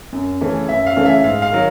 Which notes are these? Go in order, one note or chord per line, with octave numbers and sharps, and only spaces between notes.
F#2
C#3 E3 A3 C#4
F#2 E5
F5
C#3 E3 A3 C#4
E5
G#2 F5
F5
D#3 F#3